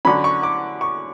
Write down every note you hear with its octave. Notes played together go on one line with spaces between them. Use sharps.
D3 F#3 C#4 B5
C#6
D6
C#6